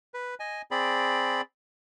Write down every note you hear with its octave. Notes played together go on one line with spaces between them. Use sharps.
B4
D#5 G#5
C4 G#4 D5 B5